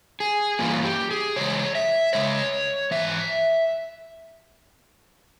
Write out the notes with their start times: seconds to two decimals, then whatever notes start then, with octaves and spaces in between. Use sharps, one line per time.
0.20 G#4
0.59 G2 E3 A#3 C#4 F4
0.84 G4
1.11 G#4
1.36 C#3 E3 G#3 C#5
1.75 E5
2.13 C#3 E3 G#3 C#5
2.91 G#2 E3 E5